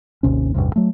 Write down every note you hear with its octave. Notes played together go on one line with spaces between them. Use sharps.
G#1 D#2 C3 C#4
A1 E2 G2 C3
F#3 A3